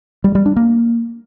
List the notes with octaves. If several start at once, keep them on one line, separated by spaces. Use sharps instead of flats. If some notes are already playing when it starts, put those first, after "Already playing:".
G3
G3
D4
A#3